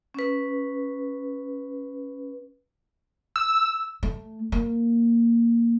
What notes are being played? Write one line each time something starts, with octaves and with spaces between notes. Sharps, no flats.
C#4 B4
E6
A3
A#3